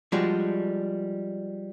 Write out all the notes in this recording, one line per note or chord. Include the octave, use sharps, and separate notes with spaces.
F3 G3 G#3 D4 F#4